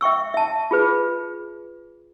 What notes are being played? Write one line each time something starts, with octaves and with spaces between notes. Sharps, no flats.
E5 G5 C#6 E6
E5 A5
F4 G#4 B4